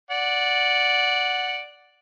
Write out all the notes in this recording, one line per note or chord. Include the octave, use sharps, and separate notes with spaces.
D5 F#5